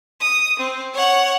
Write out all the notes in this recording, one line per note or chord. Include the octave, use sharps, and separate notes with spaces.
D#6
C4
C#5 F#5